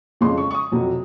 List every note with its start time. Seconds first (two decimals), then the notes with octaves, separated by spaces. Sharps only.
0.21 F2 C#3 F3 G#3 C6
0.37 C#6
0.51 C#6
0.54 D#6
0.72 F2 C3 F#3